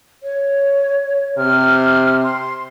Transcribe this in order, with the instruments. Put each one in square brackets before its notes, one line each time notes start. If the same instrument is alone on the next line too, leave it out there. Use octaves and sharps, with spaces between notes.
[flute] C#5
[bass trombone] C3 [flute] F6
[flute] C6